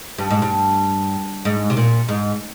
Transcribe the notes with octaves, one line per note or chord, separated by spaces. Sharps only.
G2
G#2
G2
G#2
C3
A#2
G#2